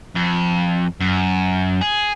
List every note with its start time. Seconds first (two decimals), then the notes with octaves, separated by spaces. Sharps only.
0.16 F2
1.00 F#2
1.81 G#4